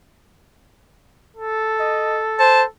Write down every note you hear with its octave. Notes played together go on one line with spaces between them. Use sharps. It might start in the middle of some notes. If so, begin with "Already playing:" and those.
A4
D#5
C5 A5